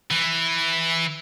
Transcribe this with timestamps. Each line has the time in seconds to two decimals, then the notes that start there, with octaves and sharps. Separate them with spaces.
0.11 E3